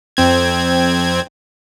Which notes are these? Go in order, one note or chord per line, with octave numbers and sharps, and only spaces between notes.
F2 C4 G#6